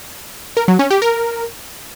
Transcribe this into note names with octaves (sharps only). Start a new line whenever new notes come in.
A#4
F#3
C#4
G4
A#4